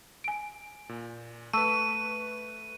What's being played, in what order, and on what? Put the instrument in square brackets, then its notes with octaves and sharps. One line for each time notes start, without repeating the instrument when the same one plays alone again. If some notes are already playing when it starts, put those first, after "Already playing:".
[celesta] G#5 D7
[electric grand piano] A#2
[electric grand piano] A3 B4 [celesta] A5 C#6 E6 [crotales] D#7